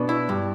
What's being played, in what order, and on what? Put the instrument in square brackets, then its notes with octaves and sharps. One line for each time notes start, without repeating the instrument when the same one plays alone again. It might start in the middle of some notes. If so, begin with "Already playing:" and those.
Already playing: [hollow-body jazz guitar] B2 [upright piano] B3 D4
[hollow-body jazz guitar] E4
G2